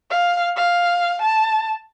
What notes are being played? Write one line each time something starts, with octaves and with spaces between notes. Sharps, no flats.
F5
F5
A5